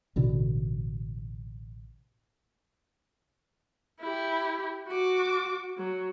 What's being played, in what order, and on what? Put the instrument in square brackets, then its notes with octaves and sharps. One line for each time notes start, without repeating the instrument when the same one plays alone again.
[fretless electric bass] A1 B2 D3
[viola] E4 G4
F#4 D6
F#3